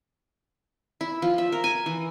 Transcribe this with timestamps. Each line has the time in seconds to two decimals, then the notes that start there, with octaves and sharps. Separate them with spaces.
1.01 E4
1.22 F3
1.38 E5
1.52 A#4
1.64 G#5
1.86 E3